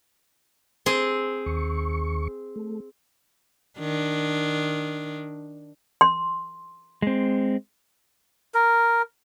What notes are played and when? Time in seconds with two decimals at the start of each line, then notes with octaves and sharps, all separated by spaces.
0.86 C4 G#4
1.46 D#2 C#6
2.56 A3
3.79 D#3 D4
6.01 C6
7.02 G#3 C4
8.54 A#4